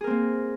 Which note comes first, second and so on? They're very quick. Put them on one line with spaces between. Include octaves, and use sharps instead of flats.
G#4 A#4 C4 A#3